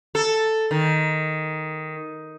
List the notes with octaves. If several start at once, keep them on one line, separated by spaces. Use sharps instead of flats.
A4
D#3